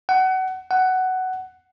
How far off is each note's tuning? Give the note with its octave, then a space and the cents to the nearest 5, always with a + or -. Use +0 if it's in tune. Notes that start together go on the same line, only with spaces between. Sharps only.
F#5 +25
F#5 +10